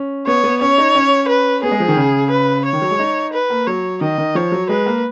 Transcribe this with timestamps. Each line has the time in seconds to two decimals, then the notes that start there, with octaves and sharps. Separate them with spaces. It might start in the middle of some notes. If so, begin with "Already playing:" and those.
Already playing: C#4
0.27 B3 C#5
0.44 B3
0.61 C#4 C#5
0.78 D#4
0.95 C#4
1.28 B4
1.63 B3 G#4
1.71 G#3
1.80 F3
1.88 D#3
1.96 C#3
2.30 B4
2.65 C#5
2.73 D#3
2.82 F#3
2.91 G#3
2.99 D#4
3.33 B4
3.50 A#3
3.67 F#3 C#5
4.01 D#3 D#5
4.18 D#3
4.35 F3 C#5
4.52 F#3
4.69 G#3 B4
4.86 A#3